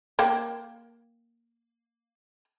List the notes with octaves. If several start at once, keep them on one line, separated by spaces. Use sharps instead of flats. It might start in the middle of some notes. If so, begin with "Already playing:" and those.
A#3 G5